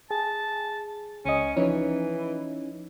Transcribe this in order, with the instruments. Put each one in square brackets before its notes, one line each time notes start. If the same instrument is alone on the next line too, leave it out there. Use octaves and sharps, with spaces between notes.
[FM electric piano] G#4 [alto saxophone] A5
[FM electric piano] C#2 D#5 [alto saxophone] C#4
[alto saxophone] E3 [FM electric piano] F3 C#4 D#4